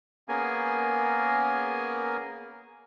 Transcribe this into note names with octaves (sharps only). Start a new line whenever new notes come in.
A#3 B3 C#4 G#4 A#4 G#5